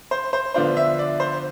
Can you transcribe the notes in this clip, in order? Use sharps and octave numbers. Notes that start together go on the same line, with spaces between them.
C5
C5
D3 F3 B3 D4 F4 C5
E5
D5
C5